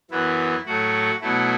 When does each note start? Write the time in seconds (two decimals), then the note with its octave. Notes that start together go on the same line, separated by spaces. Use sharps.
0.11 F#2 E3 B3 E4
0.66 A2 F#3 A3 F#4
1.21 B2 F#3 A3 E4